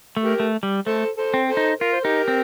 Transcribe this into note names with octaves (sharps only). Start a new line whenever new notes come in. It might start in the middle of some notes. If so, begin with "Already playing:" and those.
A3
G4 A#4
A3
G3
A3 A4 C5
A4 C5
C4
A4 C5
D#4
F4 A#4
C5
D#4 G4 A#4
C4